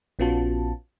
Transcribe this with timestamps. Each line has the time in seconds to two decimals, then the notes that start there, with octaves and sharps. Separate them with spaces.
0.19 A#1 B3 C#4 F4 F#4 A5